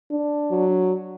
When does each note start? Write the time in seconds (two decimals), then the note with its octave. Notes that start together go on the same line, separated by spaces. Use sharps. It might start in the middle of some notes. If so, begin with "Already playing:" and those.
0.11 D4
0.51 F#3